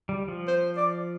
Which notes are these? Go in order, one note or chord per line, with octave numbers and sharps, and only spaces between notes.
G3
F3
C5
D5